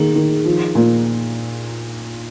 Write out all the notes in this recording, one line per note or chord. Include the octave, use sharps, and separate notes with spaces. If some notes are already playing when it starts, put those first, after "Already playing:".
Already playing: D#3 A#3 G#4
D#3
F3
A#2